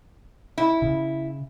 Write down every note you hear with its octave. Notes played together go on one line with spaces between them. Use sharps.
E4
C#3